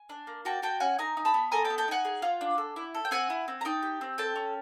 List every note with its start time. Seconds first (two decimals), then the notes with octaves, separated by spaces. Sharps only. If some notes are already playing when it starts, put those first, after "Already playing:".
Already playing: G#5
0.09 D4
0.27 A#3
0.45 F#4 G5 A5
0.62 F#4 G5 A5
0.80 C#4 F#5 G#5
0.99 D#4 G#5 A#5
1.17 D#4
1.25 A5 B5
1.34 B3
1.51 A4 G#5 A#5
1.65 G5 A5
1.70 B3
1.78 G5 A5
1.88 D#4 F#5 G#5
2.05 G#4
2.22 F4
2.41 D4
2.58 A4
2.76 E4
2.95 A4
3.05 G5
3.11 C4 F#5 G#5
3.30 E4
3.48 C4
3.61 A#5
3.65 D#4 G5 A5
3.83 G4
4.01 C4
4.18 A4 G5 A5
4.36 C#4